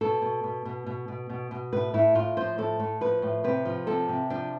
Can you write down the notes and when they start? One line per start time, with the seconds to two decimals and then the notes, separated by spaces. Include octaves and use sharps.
0.01 B2 A4
0.22 B2
0.44 B2
0.65 B2
0.86 B2
1.08 B2
1.30 B2
1.51 B2
1.73 A2 B4
1.94 A2 E4
2.15 A2 F4
2.37 F3 C5
2.58 A2 A4
2.80 A2
3.01 F3 B4
3.22 A2
3.44 C3 B4
3.65 F3
3.87 C3 A4
4.09 C3
4.30 F3 D4